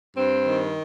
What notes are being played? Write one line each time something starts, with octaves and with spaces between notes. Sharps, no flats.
G2 C4
D#3